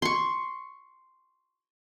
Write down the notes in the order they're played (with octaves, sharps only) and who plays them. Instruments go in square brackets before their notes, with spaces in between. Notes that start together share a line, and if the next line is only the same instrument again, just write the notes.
[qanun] C6 C#6